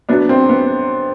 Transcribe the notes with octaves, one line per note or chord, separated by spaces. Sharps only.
F#2 F#3 B3 D4
C4
B3